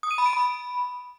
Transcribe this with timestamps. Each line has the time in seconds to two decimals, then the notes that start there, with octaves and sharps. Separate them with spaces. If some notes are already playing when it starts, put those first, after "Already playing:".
0.03 D#6
0.11 D#7
0.18 B5
0.26 D7
0.33 B5